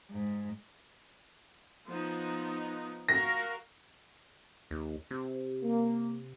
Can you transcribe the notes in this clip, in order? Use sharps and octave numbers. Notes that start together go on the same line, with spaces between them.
G#2
F3 B3 D#4
F#4 A#4 F5 A#6
D#2
C3
A#3